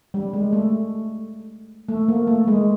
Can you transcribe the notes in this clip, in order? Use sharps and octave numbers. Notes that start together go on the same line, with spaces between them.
G3
G#3
A3
A3
A#3
A3
G#3